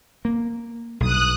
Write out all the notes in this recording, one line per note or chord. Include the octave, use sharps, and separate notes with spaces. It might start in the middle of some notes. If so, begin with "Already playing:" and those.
A#3
B1 G2 D#6 F#6